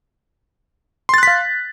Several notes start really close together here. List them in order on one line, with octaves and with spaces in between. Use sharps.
C6 A6 F#6 B6 F5